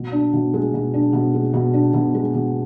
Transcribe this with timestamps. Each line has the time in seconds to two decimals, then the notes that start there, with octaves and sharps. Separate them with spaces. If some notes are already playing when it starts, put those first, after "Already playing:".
Already playing: B2
0.12 D4
0.33 B2
0.53 G#3
0.74 B2
0.94 D4
1.13 B2
1.34 G#3
1.53 B2
1.74 D4
1.94 B2
2.14 G#3
2.34 B2